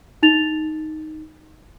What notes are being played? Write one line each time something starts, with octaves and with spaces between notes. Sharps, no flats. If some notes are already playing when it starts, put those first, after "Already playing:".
D#4 A6 F7